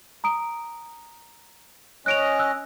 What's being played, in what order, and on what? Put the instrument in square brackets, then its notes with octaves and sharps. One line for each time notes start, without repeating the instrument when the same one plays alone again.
[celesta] A#5 D#6 D7
[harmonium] C#4 D#5 [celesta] F#6 D7 F7
[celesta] E6 F#6